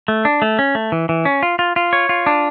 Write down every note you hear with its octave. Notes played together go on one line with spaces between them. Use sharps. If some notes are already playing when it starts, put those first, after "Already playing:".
A3
D4
A3
C#4
A3
E3
E3
C#4
F4
F4
F4
C#5
F4
D4